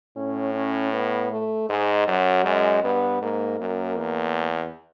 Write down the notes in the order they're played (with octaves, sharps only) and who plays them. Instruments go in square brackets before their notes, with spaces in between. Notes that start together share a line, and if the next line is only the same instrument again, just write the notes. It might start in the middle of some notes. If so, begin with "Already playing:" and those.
[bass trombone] A2 [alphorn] C#4
[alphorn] C#4
B3
A3
[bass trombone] G#2 [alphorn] G#3
[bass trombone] F#2 [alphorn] F#3
[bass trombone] F#2 [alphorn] G#3
[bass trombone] G2 [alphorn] B3
[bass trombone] G#2 [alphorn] A#3
[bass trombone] F#2 [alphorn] A#3
[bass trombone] E2